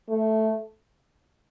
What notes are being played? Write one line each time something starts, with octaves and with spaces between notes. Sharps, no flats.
A3